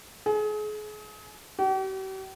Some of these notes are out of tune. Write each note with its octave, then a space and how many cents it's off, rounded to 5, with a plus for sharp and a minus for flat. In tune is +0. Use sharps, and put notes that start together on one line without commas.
G#4 +35
G4 -45